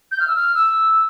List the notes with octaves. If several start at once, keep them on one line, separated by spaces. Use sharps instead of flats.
G6
F6
E6
F6
E6